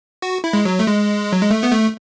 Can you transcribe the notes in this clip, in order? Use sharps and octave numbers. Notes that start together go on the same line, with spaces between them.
F#4
E4
G#3
F#3
A3
G#3
F#3
G#3
A3
B3
A3